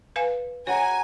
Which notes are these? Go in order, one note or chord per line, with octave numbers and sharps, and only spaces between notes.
B4 F5 G#5
F#4 C#5 F#5 G#5 A#5